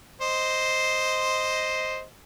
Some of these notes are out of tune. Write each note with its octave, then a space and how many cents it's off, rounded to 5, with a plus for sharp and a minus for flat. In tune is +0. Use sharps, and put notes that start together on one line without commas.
C5 +0 D#5 +0